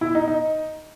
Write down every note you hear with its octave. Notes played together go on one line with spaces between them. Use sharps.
E4
D#4
D#4